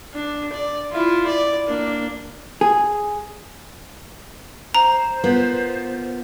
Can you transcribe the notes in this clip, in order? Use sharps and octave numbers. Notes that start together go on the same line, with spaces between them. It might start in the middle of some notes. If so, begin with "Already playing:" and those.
D4
D5
E4 F4
D5
A#3 D4
G#4
C5 A#5
B3 F4 A#4